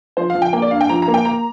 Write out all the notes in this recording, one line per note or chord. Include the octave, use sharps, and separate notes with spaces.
F3 C5
F5
F3
G5
A#3 G5
D5
G2 F5
G5
F3 A#5
A#5
A#3
G5
A#3 A#5